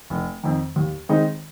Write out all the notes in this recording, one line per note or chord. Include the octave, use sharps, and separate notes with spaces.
F1
F2 D#3
D#2
D#3 G#3 C4 D#4